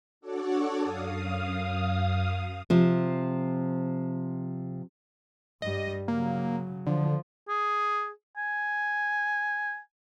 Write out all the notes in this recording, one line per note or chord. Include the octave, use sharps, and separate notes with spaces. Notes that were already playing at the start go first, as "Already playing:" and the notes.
D4 F#4 A4 C#5 D5
F#2 F5 D#6
C3 F3
G2 G3 D#5
C#3 F#3 A#3
D3 F3
G#4
G#5